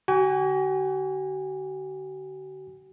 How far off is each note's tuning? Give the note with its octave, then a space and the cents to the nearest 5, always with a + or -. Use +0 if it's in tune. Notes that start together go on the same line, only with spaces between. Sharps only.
D3 -20 F#4 +45 G#5 -25